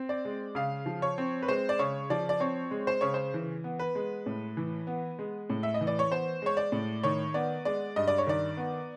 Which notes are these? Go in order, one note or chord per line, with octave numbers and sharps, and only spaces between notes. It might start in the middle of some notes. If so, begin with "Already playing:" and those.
Already playing: C4
D5
G#3
C#3 F5
F3
C#5
C4
B4
G#3 C5
D5
C#3 C#5
F3 D5
D5
C4 C#5
G#3
C5
C#3 C#5
C5
E3
B3
B4
G#3
A2
E3
B3
G#3
A2
E5
D#5
E3
D5
C#5
B3 C5
G#3 C#5
D5
A2
D#3 C#5
B3 D5
G#3 D5
G2 D#5
D5
C#5
D#3 D5
B3